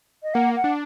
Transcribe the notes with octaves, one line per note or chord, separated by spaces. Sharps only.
D#5
A#3 F#5
F#5
D4